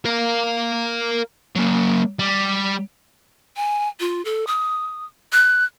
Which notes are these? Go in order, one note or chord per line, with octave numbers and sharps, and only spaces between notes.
A#4 F5
F#3 A#3
G3
G#5
F4
A4
D#6
F#6